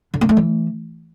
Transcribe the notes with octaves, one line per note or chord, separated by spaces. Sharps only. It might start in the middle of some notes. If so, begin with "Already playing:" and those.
D3
A#3
A3
E3